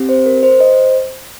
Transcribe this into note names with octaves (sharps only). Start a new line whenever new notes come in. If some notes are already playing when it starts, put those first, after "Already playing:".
Already playing: C4 G4
C5
A#4
C5
C5 D#5